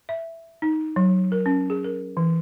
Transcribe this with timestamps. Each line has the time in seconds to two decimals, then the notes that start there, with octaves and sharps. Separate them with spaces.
0.09 E5
0.62 D#4
0.96 F#3
1.32 A#4
1.46 C#4
1.70 G#4
1.84 A#4
2.17 E3